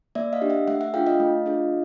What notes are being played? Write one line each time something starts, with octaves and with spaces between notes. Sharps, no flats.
A#3 D5 E5
D#5 F5
D4 G4
E5 F#5
A3 E5 F#5
E5 F#5
D4 F4 G#4 F5 G5
D#5 F5
A3
D4 F4 G#4